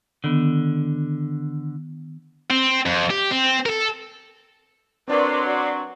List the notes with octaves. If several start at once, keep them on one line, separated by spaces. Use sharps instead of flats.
D3 D#3 B3
C4
F2
G4
C4
A4 A#4
F#3 C4 D4 A#4 B4 D5 C6
F#4